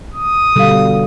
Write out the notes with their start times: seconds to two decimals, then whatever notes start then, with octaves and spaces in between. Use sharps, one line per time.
0.14 D#6
0.56 B2 D3 G3 A4 F5